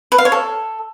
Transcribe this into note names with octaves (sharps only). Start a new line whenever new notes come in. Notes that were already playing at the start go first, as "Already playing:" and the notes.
B4
F5
C#5
A4